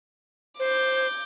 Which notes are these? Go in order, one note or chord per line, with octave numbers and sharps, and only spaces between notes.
C5 D6 G6